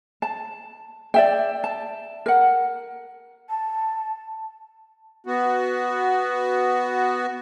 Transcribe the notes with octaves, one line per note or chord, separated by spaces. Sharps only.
A5
D5 E5 G5
A5
A#4 F#5
A5
B3 F#4